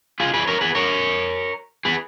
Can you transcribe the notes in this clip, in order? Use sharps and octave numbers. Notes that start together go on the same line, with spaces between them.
F4 G#4
G#4 B4
A#4 C#5
G#4 B4
A#4 C#5
G#4 B4